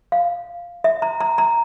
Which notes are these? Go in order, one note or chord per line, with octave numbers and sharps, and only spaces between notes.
F5
E5
A#5
A#5
A#5